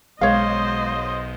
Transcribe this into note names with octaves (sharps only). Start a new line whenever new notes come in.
B1 G#3 C5 C#5 D#5 F5